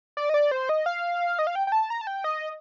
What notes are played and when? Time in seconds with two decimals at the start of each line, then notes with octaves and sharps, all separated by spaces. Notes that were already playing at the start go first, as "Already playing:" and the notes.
0.17 D5
0.29 D#5
0.34 D5
0.51 C5
0.69 D#5
0.86 F5
1.39 D#5
1.47 F5
1.55 G5
1.67 G5
1.72 A5
1.90 A#5
2.01 A5
2.07 G5
2.24 D#5